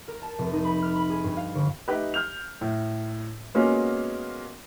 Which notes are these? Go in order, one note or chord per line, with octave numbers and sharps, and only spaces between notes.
A#4
A5
F1
D#4
B5
F6
B5
G#4
G2
F5
G1
A3 D#4 G4 B4
F6 G6 F7
A2
G#3 A#3 B3 C#4 F4 F#4